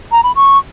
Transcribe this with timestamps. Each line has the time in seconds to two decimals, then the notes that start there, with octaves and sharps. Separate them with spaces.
0.12 A#5
0.23 B5
0.35 C#6